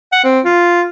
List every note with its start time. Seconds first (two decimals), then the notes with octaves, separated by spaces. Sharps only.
0.12 F#5
0.24 C4
0.45 F4